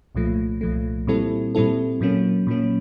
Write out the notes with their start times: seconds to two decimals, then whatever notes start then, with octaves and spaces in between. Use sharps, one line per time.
0.15 C2 A#2 F3 A3
0.61 C2 A#2 F3 A3
1.07 A#2 G3 C4 E4 A4
1.55 A#2 G3 C4 E4 A4
2.01 A#2 F#3 A#3 C#4
2.47 A#2 F#3 A#3 C#4